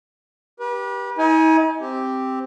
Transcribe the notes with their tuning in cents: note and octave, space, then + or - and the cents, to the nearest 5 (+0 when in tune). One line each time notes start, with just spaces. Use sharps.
G4 +0 B4 -35
D#4 +45 G#5 +5
C4 +0 G4 +0